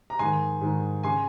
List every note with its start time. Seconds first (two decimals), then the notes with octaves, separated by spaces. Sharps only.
0.10 A#5
0.19 G#2 D#3 G#5 C6
0.61 G#2 D#3
1.03 C#3 G#5 C6